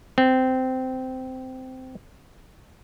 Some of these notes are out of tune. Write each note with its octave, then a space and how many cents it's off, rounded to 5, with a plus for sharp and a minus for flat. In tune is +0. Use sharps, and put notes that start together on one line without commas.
C4 -15